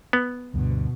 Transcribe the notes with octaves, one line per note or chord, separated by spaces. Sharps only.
B3
D2 G2 B2 D3